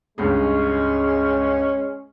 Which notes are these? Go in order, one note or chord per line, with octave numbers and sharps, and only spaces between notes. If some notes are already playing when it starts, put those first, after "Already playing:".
C#2 G2 G#3 C#4 G#4